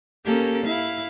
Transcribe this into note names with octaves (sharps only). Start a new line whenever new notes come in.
A#3 C#4 G4 A4 A#4
E4 F5